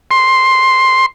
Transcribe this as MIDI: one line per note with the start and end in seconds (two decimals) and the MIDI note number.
0.11 1.06 84